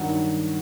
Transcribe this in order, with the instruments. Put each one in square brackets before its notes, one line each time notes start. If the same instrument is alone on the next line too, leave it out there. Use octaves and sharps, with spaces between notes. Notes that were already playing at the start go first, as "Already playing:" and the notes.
Already playing: [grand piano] G2 D#3 F#3 F#4